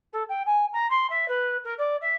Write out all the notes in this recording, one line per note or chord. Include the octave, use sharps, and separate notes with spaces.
A4
G5
G#5
A#5
C6
E5
B4
A#4
D5
E5